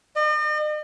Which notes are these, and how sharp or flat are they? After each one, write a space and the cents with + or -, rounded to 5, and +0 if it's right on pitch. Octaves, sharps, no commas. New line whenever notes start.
D#5 -45